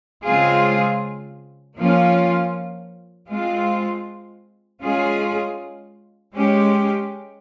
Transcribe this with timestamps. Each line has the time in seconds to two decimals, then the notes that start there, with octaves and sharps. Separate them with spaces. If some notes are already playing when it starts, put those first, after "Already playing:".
0.24 C#3 G#3 C4 F4 G#4
1.77 F3 A#3 C#4 F4
3.30 G#3 C4 F4
4.82 G#3 C#4 F4 G#4
6.34 G#3 C#4 G4